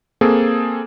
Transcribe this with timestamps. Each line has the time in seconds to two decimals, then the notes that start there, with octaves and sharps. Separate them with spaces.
0.21 A#3 C4 G#4 A4